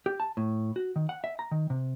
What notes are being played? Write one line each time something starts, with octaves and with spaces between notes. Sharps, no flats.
G4
A5
A2
F#4
D#3
F#5
E5
A#5
D#3
C3